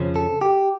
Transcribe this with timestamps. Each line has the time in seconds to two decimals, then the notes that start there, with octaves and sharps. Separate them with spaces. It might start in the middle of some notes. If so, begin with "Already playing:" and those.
Already playing: F2 C#3 F3 C#4
0.16 A4
0.41 G4